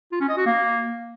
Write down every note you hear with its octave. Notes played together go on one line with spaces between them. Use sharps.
F4
C#4
D#5
F#4
A#3